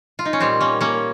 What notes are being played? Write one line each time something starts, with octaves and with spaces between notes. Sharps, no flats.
F4
D#4
C#4
A#2 G3 C4
A#3 C#4
A#3 C#4